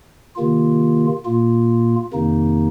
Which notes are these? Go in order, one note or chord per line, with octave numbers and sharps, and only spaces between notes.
C3 D#3 A#3 F4
A#2 A#3 F4
F2 C3 D#3 A#3 D#4